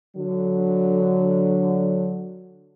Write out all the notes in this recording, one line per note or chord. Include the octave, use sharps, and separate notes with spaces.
D3 F#3